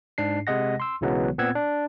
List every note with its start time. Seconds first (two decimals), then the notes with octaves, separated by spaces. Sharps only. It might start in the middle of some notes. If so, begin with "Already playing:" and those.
0.18 G#2 D4 C7
0.47 C3 G#3 D#5 F#5 A#6
0.80 C6 E6
1.01 B1 C#3 E3 F#3 G#3 B3
1.38 A#2 B3 C4 F#5 E6 G#6
1.55 D4